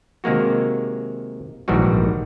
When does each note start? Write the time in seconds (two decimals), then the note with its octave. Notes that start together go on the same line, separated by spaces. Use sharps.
0.24 C3 D#3 G#3 A#3 F#4
1.68 A#1 G#2 D#3 E3 G3 F#4